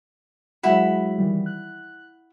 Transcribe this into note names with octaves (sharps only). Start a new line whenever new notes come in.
F#3 G#3 E4 F#4 F#5 B5
D#3 E3 G3
F#6